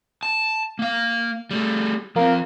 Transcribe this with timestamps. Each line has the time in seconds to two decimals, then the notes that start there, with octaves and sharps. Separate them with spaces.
0.23 A5
0.79 A#3 F5
1.51 G3 A3
2.16 F3 A#3 C4